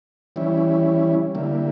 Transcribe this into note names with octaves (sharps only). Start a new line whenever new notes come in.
E3 G3 C#4 E4
D3 G3 A#3 E4